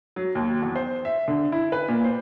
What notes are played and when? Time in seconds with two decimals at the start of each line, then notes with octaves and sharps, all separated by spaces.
0.16 F#3
0.35 D#2
0.62 E2
0.76 C5
1.05 E5
1.28 D3
1.52 E4
1.72 B4
1.88 A#2
2.04 C5